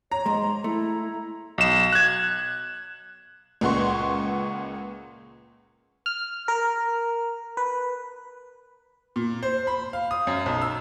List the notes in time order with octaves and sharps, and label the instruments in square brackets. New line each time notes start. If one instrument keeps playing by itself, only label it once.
[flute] C#5 [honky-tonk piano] A#5
[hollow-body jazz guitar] G#2 G#3 [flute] C6
[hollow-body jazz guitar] A3 [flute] E4
[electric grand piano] B1 E7
F#6 G#6
[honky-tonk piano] C#2 A#2 B4 F#5 C6 C#6
[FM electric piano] F6
A#4
B4
[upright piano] A#2
C5
B5
F5
D#6
F#2
B1
E6